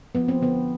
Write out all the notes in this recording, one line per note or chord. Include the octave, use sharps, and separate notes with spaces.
F3 B3
C4
D3 B3